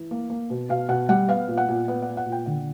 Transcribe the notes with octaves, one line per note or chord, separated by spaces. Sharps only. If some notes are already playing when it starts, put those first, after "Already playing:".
Already playing: E3
A#3
A#3
B2
B2 F5
B2 F#5
G3 F#5
B3 F5
A#2
F#5
A#2
B3 F#5
F#5
B3
F#5
A#2
G5
D3 F#5